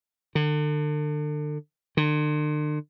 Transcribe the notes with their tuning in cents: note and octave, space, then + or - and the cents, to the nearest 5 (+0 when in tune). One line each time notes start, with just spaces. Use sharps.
D3 +35
D3 +45